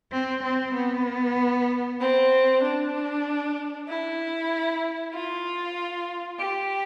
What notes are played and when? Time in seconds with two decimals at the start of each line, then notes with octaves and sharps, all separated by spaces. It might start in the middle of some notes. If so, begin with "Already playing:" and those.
0.11 C4
0.42 C4
0.73 B3
1.99 C4
2.62 D4
3.88 E4
5.13 F4
6.39 G4